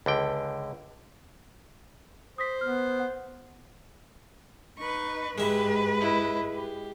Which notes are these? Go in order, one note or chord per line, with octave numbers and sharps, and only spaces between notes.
C#2 D3 G5
C5 D#6 A#6 B6
B3 F6
F#5
D#4 B4 C#6
G#2 G#3 G4 B4 E5
E4 D#5
G4